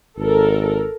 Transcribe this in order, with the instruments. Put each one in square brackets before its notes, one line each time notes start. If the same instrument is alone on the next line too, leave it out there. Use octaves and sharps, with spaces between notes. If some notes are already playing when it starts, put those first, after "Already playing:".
[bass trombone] G#1 [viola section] A4 A#4